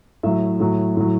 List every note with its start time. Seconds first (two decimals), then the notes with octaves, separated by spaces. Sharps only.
0.23 A2 F#3 E5
0.60 A2 F#3
0.97 A2 F#3